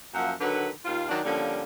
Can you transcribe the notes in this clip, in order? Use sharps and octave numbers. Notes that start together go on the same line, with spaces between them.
F#2 F3 A#3 E5 F#5
D3 D#3 F#3 B4
D#2 F4
D#3 F#3 D4
D3 F3 G3 A#3 C#4